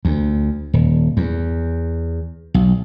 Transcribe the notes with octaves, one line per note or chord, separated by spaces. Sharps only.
D2
D#1
E2
B1